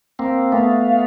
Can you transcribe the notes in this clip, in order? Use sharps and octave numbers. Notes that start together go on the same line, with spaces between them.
A#3 C4
A3 B3 F5